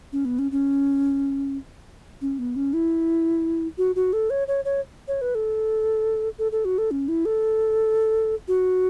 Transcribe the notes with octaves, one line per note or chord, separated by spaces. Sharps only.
C#4
B3
C#4
C#4
C#4
B3
C#4
E4
F#4
F#4
A4
C#5
C#5
C#5
C#5
B4
A4
A4
A4
F#4
A4
C#4
E4
A4
F#4